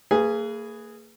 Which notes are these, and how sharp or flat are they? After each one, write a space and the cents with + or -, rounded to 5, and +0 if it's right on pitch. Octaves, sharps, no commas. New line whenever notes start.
A#3 -40 G#4 +0 B4 +0